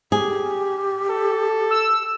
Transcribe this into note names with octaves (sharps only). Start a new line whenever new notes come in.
G4 G#4
A4
E6